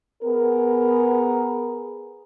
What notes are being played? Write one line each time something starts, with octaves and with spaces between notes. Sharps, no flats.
B3 G#4 A#4